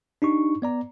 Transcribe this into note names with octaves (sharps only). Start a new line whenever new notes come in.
D4 D#4 G4 C#6
B3 D5 A#5